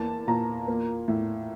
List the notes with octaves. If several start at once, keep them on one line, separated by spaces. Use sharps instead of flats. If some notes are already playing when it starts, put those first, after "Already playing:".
Already playing: E2 A#3 A5
A#2 A#5
A#3
A2